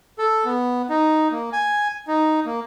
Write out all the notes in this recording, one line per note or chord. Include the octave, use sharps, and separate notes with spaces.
A4
B3
D#4
A#3
G#5
D#4
A#3